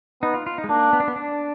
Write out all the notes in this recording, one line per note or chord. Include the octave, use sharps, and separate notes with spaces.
B3 D#4
F4
F4
D#4
G#3
A#3 D4
B3
D4
B3
D4